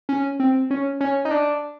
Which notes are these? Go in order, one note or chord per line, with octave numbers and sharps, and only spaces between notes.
C#4
C4
C#4
C#4
D#4
D4